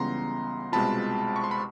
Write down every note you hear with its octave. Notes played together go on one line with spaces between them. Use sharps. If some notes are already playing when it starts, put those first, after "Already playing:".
Already playing: C#2 C#3 E3 G3 B3 A#5 C6
C2 B2 G#3 C4 F4 A5 B5
C#6
C6
B5